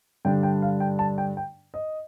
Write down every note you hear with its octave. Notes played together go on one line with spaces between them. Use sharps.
G2 D3 G3 D4 G5
G5
F5
G5
A5
G5
G5
D#5